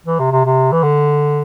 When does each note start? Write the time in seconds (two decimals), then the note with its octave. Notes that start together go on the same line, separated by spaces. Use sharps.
0.06 E3
0.19 C3
0.32 C3
0.45 C3
0.72 E3
0.83 D3